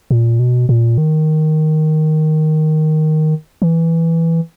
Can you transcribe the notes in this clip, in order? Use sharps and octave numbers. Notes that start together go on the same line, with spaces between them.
A#2
B2
A#2
D#3
E3